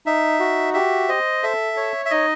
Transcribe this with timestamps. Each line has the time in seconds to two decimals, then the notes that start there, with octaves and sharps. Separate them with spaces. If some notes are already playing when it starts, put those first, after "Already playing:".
0.06 D#4 E5
0.40 F#4
0.74 G4 E5
1.09 C5 D#5
1.43 A4 E5
1.77 C#5
2.06 E5
2.11 D#4 D#5